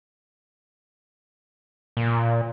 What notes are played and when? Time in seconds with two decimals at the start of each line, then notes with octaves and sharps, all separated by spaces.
1.97 A#2